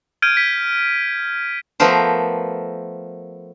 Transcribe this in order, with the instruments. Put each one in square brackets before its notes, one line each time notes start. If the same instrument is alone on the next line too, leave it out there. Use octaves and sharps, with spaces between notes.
[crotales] F6 G6 G#6 D7 D#7
B6
[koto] F3 A3 B3 A#4 C5